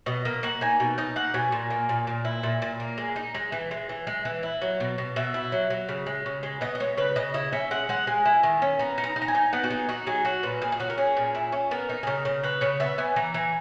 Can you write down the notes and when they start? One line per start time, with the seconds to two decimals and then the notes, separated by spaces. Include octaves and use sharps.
0.06 B2 D#5
0.25 A#3 D#5
0.43 A#3 F#5
0.61 D#4 G#5
0.80 B2
0.98 D#4 D#5
1.16 A#3 F#5
1.34 B2 G#5
1.52 A#2
1.70 A#3
1.89 A#2
2.07 A#2
2.25 E4
2.43 A#2
2.62 A#2
2.80 A#3
2.98 G#3
3.16 D#4
3.35 G#3
3.52 E3
3.71 G#3
3.89 E3
4.07 G#3
4.25 E3
4.43 E4
4.62 F#3
4.80 B2
4.98 B2
5.16 B2 E5
5.34 E4
5.52 F#3
5.70 F#3
5.89 C#3
6.06 G#3
6.26 C#3
6.43 G#3
6.61 B3 D#5
6.75 D#5
6.80 G#3 C#5
6.97 C#3 B4
7.16 C#3 D#5
7.34 E4 D#5
7.52 C#4 E5
7.71 G#3 F#5
7.89 G#3 F#5
8.07 G#3 G#5
8.25 E4
8.43 D#3
8.62 C#4
8.79 B3 A#5
8.98 D#4
9.04 A#5
9.16 D#4
9.22 A#5
9.28 G#5
9.35 D#4
9.53 B3 F#5
9.64 F#4
9.70 D#4 G#4
9.89 D#4 F#4
10.07 F#3 G#4
10.25 C#4 F#4
10.43 A#2 B4
10.61 A#2 G#4
10.72 G#4
10.80 C#4 F#4
10.90 A#4
10.97 C#4 G#4
11.17 A#2
11.35 E4
11.52 C#4
11.71 B3 A#4
11.89 D#4
12.03 G#4
12.07 C#3 A#4
12.25 C#3
12.43 C#3 B4
12.61 C#3 C#5
12.80 B3 E5
12.98 B3 G#5
13.16 E3 A#5
13.34 E3 G#5